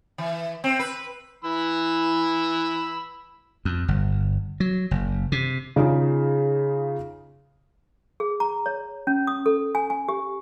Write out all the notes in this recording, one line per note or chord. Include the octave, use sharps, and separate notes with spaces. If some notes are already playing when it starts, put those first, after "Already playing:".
E3
C4
B4
E3 B5 E6
F2
G1
F#3
F#1
C3
C#3 D#4 F4 G#4
G#4
A#5
C#5
C#4
D#6
A4
G#5
G#5
G4